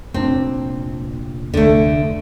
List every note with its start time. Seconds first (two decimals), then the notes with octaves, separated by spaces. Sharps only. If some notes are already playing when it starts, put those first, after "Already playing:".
0.14 F1 A#2 C4 D4
1.54 F1 D2 D3 A3